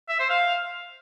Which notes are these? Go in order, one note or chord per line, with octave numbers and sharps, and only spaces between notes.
E5
C5
F5